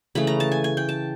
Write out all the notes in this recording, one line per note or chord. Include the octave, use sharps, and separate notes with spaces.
C#3 E3 A3 B5
A#5
A5
G#5
G#5
G5
A5